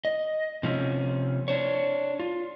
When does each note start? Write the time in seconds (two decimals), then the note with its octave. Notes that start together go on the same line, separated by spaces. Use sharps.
0.05 D#5
0.63 C3 F3 A3 C#4
1.48 D4 C5 C#5
2.20 F4